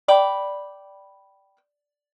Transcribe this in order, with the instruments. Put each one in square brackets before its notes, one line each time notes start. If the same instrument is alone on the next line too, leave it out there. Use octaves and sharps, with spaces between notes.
[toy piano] D5 [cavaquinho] G5 B5 D6